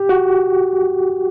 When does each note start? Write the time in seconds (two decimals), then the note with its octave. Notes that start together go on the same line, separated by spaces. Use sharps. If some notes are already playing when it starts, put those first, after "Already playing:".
Already playing: G4
0.09 F#4